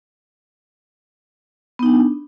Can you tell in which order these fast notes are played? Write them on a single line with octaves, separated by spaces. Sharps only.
B3 D#4 D4